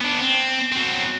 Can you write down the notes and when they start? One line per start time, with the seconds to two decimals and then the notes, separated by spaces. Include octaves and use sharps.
0.01 B3 D4
0.21 C4
0.72 F#3 C4